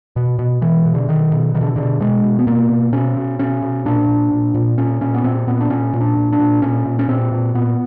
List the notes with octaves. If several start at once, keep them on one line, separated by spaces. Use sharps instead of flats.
B2
B2
B2 E3
B2
D3
B2 D#3
B2
B2 D#3
D3
B2 D3
B2 G#3
B2
B3
B2 A#3
B2
B2 C#4
B2
B2 C#4
B2
A#2 D4
A#2
A#2
A#2
A#2 C#4
A#2 C#4
B3
A#2 C4
A#2 B3
D4
A#2 C#4
A#2
D4
A#2
D4
A#2
A#2 C#4
A#2
C#4
A#2 C4
A#2
A#2 B3